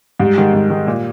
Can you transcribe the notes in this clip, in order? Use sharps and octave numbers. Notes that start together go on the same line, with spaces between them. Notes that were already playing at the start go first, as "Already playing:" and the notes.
G#2 G3
D#3 G#3
G#2
D#3 G#3
A#2